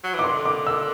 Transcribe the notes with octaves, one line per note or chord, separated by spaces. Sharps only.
F#3
E3
D6
D3 C6
D6
E6